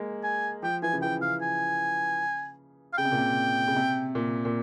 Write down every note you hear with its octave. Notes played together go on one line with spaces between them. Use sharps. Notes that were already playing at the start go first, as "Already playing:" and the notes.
Already playing: G#3 A#3
G#5
F3 G5
E3 G#5
C#3
E3 G5
C#3 F5
G#5
F5
C#3 G5
C3
A#2
C3
C#3
C3
A#2
A#2